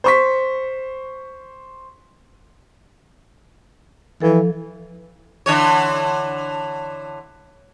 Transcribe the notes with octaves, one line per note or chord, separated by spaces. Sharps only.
C5 C#6 B6
E3 F3 A4
D3 E3 C#5